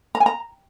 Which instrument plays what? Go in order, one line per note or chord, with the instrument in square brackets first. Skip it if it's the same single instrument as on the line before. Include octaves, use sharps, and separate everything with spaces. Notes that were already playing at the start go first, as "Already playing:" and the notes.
[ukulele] A#5
G#5
A#5